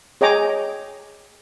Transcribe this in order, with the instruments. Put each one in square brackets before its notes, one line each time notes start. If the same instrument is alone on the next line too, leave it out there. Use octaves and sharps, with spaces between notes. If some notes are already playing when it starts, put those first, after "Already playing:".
[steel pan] G#4 C#5 D#5 G5 A#5 D6